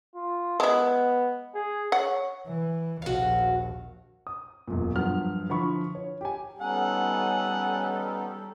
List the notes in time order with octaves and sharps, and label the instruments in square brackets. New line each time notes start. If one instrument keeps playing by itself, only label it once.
[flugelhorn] F4
[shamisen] G#3 E4 [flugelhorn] B3
[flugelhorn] G#4
[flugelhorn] C#5 [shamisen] F#5
[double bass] E3
[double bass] A#1 D#2 [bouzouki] F#4 F5
[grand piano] D#6
E1 F#2 A#2
G2 F3 F#3 F6
D3 F3 E4 B5 C#6
C#5
G4 G#5
[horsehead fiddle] G3 A4 [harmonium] B3 C#4 D#4 [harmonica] F#5 [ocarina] G#5